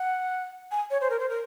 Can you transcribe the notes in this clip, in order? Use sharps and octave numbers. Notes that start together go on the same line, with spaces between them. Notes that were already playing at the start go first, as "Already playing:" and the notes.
Already playing: F#5
G#5
C#5
C5
A#4
C5
A#4